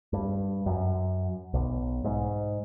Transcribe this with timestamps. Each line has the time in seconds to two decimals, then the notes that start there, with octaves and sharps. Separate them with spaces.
0.13 G2
0.66 F#2
1.54 B1
2.04 G#2